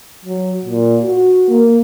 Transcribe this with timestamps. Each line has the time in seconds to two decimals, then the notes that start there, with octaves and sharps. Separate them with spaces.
0.25 F#3
0.65 A#2
1.02 F#4
1.49 A#3